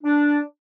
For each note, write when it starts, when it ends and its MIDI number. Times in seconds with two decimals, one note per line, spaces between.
0.03 0.38 62